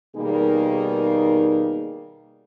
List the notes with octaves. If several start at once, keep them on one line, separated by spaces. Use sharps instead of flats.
B2 D#3 G3 A#3 D#4 G#4